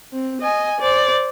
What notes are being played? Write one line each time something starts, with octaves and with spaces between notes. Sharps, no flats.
C4
D#5 G#5
C5 D5